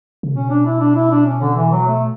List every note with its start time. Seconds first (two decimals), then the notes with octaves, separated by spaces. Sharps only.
0.23 C#3
0.35 B2 C#4
0.50 D4
0.66 E4
0.80 D4
0.96 E4
1.11 D4
1.26 C#4
1.41 D3
1.56 E3
1.72 F#3
1.87 A3